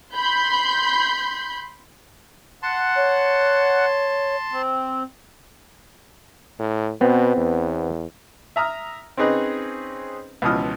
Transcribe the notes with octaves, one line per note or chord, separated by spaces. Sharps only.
B5 C6 G6
F#5 A5 C6
C#5
C4
A2
B2 B3 C4
E2
E5 A#5 D#6 F6
C4 C#4 D#4 G#4 B4 D#5
C#2 B2 E3 F3 D#6 F6